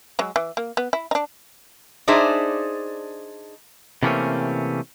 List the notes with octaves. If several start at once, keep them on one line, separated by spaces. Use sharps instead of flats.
F#3 G#3
E3
A#3
B3
E4
D4 D#4
D4 D#4 G#4 C5 D5 E5
C3 E3 A3 A#3 C4 C#4